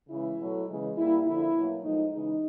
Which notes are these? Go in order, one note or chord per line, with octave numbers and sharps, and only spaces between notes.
C#3 E3 G#3 E4
B2 F#3 A3
C#3 E3 G#3
A#2 G3 A#3 E4
D3 F3 A#3 E4
B2 F#3 A#3
A2 F3 G#3 D#4
C#3 E3 G#3 D#4